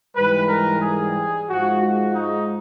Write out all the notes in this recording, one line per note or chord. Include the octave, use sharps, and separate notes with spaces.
G#2 E3 G3 B4
A#4
G#4
G#2 F3 G#3 F#4
F#4
D#4